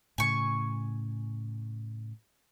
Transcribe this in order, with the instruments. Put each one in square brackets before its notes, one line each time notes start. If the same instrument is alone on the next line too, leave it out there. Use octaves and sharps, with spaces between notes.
[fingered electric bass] A2 C#3 [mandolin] G#5 C#6